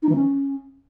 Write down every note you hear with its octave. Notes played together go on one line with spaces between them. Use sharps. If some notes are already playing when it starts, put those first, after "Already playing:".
D#4
E3
C#4